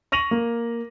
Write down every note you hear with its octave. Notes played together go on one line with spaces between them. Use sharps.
C#6 A#6 D#7 F7 F#7
A#3